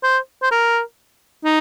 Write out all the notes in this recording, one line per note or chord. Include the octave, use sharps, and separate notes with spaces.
C5
C5
A#4
D#4